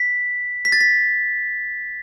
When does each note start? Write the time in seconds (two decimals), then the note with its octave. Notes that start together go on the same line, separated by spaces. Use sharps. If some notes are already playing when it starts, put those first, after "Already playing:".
Already playing: B6
0.65 B6
0.72 A6
0.81 B6